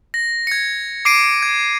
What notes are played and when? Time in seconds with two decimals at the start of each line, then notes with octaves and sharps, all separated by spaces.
0.14 A#6
0.47 G#6 C#7
1.05 D6 C7 D7 D#7
1.43 G#6